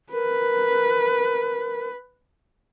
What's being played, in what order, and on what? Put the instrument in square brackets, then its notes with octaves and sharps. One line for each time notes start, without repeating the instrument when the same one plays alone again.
[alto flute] A#4 [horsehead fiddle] B4